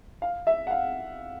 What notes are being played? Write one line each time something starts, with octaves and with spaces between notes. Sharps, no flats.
F5
E5
F#5
F5